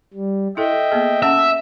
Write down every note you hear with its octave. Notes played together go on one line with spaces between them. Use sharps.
G3
E4 A4 D#5 E5 G5
A#3 B3 G#4
C#4 E5 F#5 A5